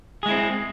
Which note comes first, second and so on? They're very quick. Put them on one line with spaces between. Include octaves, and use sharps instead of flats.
G#4 G#3 E4 C4